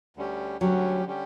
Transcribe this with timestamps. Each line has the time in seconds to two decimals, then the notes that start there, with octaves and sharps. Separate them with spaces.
0.17 D2 D3 G3 C#4 G4
0.60 D2 D3 F#3 G3 C#4 G4
1.05 D3 G3 C#4 G4